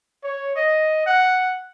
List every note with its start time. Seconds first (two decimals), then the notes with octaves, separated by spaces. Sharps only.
0.24 C#5
0.56 D#5
1.06 F#5